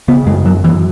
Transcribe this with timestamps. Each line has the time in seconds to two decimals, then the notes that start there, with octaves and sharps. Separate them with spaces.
0.08 C#3 B3
0.26 F#2 G#3
0.45 F#2 F#3
0.64 F#2 E3